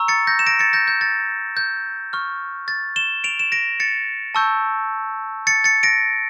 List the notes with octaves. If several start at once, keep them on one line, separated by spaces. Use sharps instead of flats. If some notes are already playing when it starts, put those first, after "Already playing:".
Already playing: A#5 C#6 E6
A6 C#7
G6 A#6
E7
A#6 D7
A6 C#7
G6 A#6
G6
A6
G6
C#6 F6
A6
E7 G7
D7 F7
E7
A#6 D7
A6 C#7
A5 C#6 E6 G6
A6 C#7
A6 C#7
A#6 D7